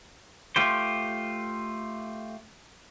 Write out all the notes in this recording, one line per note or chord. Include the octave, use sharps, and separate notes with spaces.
A3 F4 G4 C5